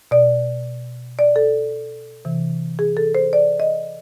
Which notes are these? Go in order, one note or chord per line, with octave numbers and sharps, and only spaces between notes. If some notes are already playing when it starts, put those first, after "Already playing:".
B2 D5
D5
A4
C3 E3
G#4
A4
C5
D5
D#5